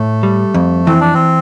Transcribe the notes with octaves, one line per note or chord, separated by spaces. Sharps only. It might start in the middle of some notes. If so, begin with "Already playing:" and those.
Already playing: A2 A3
G3
F2
E3 C4
D4
C4